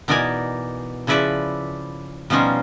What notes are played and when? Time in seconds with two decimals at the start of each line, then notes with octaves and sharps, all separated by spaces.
0.08 B2 E3 D#4 A#4 D5 G#5
1.07 C#3 F3 E4 B4 D5 E5
2.30 B2 F3 G3 C#4 D#4 F4